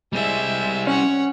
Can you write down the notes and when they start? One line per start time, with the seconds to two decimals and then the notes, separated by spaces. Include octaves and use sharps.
0.13 G3 G#3 C4 E5
0.87 C#4 C#5 F#5